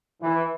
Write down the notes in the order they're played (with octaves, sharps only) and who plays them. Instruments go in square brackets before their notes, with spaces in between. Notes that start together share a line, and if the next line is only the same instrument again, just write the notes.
[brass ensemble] E3